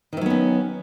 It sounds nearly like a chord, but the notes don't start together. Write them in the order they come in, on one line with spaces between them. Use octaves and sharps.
D#3 E3 F#3 B3 C#4